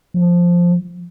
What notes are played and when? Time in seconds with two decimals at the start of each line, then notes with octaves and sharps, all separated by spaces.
0.14 F3